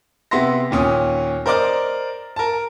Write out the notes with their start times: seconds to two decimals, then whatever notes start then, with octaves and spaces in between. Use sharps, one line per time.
0.31 C3 B3 E5 C6 A#6
0.71 D#2 A#2 C#4 D#6
1.46 A#4 C5 D5 D#5 D6 F6
2.36 A#4 A5